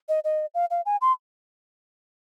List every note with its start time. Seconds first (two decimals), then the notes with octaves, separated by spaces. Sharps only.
0.09 D#5
0.24 D#5
0.54 F5
0.71 F5
0.86 G#5
1.01 C6